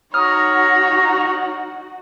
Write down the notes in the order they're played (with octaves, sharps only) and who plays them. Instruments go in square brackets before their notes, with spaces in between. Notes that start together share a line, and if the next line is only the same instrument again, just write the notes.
[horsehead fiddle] D#4 F#4 [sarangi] C#5 [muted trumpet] A#5 [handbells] D#6 F6